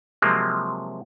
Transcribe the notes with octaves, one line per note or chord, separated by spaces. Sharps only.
C3 F3 F#3 G#3 A#3 C4